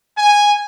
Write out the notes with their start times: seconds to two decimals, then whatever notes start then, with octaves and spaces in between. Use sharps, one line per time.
0.16 G#5